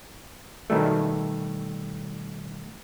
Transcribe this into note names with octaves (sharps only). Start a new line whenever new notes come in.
B2 D#3 G3 A3